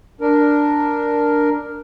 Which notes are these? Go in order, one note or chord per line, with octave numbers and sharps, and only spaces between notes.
D4 A#4